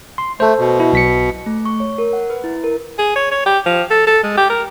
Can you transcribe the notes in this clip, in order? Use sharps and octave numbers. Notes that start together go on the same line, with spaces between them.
C6
A3 A4 C5
B2
E4
B1 B6 C#7
A3
C#6
C#5
A#4
F#5
B4
E4
A#4
G#4
C#5
C#5
G4
F3
A4
A4
G#3
G4
A#4